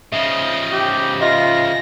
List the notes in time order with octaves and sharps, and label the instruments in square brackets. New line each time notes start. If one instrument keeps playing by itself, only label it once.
[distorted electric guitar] C#3 F3 [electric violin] D#5 [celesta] E5
[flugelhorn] G4
[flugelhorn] F4 [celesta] D#5 E5 [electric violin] A#6